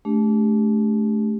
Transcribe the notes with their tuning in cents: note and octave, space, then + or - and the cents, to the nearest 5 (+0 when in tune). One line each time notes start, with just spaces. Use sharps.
A3 -25 D4 -30 G4 +15